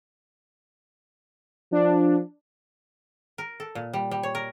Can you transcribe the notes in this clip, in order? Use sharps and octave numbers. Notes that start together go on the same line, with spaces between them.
F3 D4
A#4
A4
A#2
G3
G3
C#5
A#4